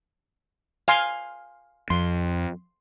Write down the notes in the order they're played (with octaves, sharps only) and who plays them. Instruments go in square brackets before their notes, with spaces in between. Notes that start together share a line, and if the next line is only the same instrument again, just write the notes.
[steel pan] F5 G#5 C6
[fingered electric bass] F2 [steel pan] C6